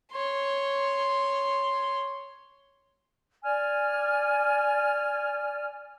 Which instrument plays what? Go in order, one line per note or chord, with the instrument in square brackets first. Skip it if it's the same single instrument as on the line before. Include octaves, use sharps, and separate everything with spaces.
[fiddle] C#5 C6
[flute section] D5 G#5 F6